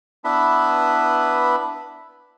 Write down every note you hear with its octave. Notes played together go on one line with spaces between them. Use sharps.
B3 D4 E4 B4 B5